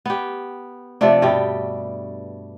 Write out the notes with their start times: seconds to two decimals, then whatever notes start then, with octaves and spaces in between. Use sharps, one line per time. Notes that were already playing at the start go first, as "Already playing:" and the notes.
0.06 B3 G4
1.01 C3 F3 A3 D4
1.22 G2 B2 G3 G4